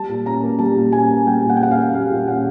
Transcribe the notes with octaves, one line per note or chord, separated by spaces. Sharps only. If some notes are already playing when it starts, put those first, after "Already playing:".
Already playing: G3 A5
A#2
C#4 A#5
A#3
G3 A5
A#2
C#4 G#5
A#3
G3 G5
A#2
F#5
G5
C#4 F#5
F5
A#3
G3 F5
A#2
C#4 F#5